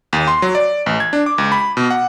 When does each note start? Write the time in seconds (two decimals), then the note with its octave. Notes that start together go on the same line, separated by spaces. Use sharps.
0.13 D#2
0.28 C6
0.42 F#3
0.55 D5
0.86 A1
1.00 G#6
1.13 D4
1.26 D6
1.38 C#2
1.52 B5
1.77 B2
1.90 F#5